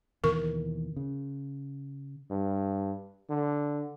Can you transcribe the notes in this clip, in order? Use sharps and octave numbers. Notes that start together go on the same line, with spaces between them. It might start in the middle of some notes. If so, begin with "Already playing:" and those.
D#2 B2 E3 A#4 C#6
C#3
G2
D3